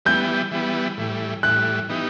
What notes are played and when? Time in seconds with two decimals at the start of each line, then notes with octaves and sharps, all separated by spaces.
0.05 E3 G3 B3 G6
0.51 E3 G3 B3
0.97 A2 E3 G3
1.43 A2 E3 G3 F#6
1.89 E3 B3 D#4 G4